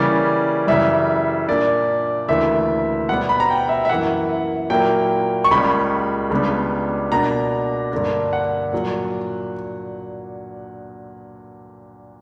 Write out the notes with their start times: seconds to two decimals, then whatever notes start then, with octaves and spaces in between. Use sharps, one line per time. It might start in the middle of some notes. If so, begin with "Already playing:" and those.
Already playing: C#3 E3 G3 A#3 C#4 D5
0.67 F#2 C#3 E3 G3 E5
1.48 A#2 A#3 D4 D5
2.29 D2 C#3 E3 A#3 E5
3.09 B2 G3 B3 F#5
3.29 B5
3.40 A#5
3.50 G5
3.69 E5
3.85 E5
3.89 F#2 E3 A#3 E4 F#5
4.70 A#2 F#3 A#3 E4 G5
5.44 C#6
5.51 C#2 C#3 G3 A#3 B5
6.31 C#2 C#3 G3 B3 D4
7.12 B2 A#3 D4 A#5
7.92 G2 D3 A#3 D4
8.33 F#5
8.73 A#2 F#3